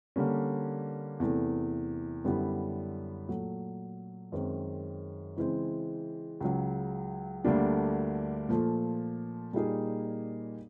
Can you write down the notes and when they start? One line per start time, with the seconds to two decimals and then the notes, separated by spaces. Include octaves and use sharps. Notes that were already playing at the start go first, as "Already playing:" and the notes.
0.16 D3 G3 A#3 C#4
1.20 E2 C3 E3 A3
2.24 F#2 D3 G3 B3 E4
3.28 A#2 F#3 A3
4.32 F#2 D#3 G#3 C4
5.36 C#3 E3 G#3 C4
6.41 C#2 C#3 F#3
7.44 D2 D3 G3 A#3 D4
8.49 A#2 F3 A3
9.53 A#2 G3 A#3 D#4 G#4